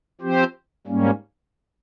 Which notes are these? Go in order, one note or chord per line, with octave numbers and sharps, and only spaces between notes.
F3 C4 G4 C5
G#2 G3 A#3 C#4